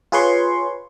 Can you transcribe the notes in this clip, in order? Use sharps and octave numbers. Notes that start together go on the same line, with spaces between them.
F4 G#4 B4 C#5 C6 C#6